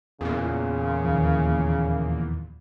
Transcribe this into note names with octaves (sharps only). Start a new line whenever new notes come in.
E2 A#2 C#3
D#2 D#3 F3